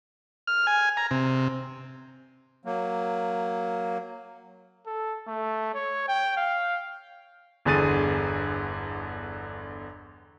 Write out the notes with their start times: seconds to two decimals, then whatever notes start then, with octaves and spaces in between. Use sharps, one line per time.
0.47 F6
0.67 G#5
0.97 A#5
1.11 C3
2.65 F#3 A#3
4.86 A4
5.28 A3
5.74 C#5
6.08 G5
6.37 F5
7.65 G1 E2 D3 G#4 A6 D#7